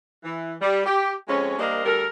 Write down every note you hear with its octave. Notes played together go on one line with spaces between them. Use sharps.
E3
G3
G4
F2 G#3 C4 C#4
G3 A#3 D4 A#4 C5 D#5
D2 G3 A4 A#4